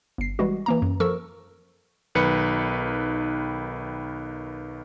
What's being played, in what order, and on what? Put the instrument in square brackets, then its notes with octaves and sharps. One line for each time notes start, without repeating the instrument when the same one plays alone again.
[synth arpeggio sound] G1 C7
E3 G3 G#3 F#4
E3 A#3 A#5
F#2
F3 A4 A#4 C#6 E6
[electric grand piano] B1 D#3 B4 C#7